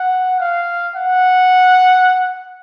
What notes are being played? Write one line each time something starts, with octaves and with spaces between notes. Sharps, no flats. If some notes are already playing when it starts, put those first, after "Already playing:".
Already playing: F#5
F5
F#5